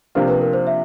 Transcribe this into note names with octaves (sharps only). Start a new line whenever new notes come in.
C3 F3 A#3 D4 F4 C5
B4
A#4
C5
E5